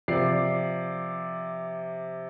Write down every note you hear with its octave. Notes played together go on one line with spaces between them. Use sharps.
C3 F3 D5 C7